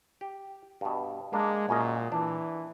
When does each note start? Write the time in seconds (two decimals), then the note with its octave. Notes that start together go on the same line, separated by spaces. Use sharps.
0.21 G4
0.81 G2 B2
1.33 G#3 A#3 D4
1.69 F#2 A#2 C#4 D#5
2.12 E3 D4